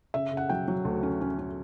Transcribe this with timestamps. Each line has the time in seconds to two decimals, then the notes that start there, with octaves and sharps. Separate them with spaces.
0.14 C#3 E5
0.32 C#3
0.37 F#5
0.49 F#3 G5
0.68 F#3
0.85 D2
1.03 C#4
1.21 C#4
1.39 C#4